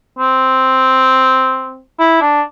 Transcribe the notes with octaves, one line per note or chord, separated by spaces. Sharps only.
C4
E4
D4